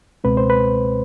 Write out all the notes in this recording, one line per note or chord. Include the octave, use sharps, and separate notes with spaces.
C#2 B2 G#3 C4 B4
C5
B4